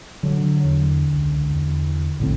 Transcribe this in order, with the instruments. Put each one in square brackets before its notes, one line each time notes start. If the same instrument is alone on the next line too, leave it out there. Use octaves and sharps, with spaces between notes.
[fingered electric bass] D3 [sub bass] F#3
[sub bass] E2
C#2
E2
[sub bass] A#1 [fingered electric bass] A2 D3 C4